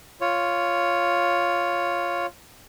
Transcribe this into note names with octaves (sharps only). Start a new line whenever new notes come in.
F4 C#5